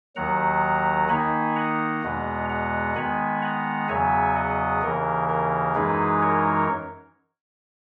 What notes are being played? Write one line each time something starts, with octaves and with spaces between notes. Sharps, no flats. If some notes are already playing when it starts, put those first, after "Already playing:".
D#2 D#3 F#3 F#5 A#5
D#3 A#3 D#4 G#5 B5
F#5 A#5
E2 B2 G#3 B3
F#5 A#5
D#3 G#3 B3 G#5 B5
F#5 A#5
E2 C#3 F#3 B3 E5 G#5
D#5 F#5
D#2 C#3 E3 A#4
A#4
F#2 E3 G#3 D#4 G#4 B4
A#4 C#5